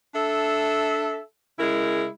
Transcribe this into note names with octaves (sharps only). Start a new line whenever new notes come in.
D4 A4 E5
C#3 G#3 E4 A#4